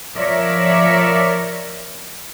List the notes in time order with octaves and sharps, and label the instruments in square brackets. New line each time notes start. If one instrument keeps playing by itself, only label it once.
[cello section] F3 A#4 C#5 D5 E5